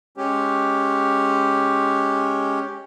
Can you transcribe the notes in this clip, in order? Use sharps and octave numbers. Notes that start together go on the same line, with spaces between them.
G#3 C#4 G4